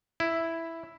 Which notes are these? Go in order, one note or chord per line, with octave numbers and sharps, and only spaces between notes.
E4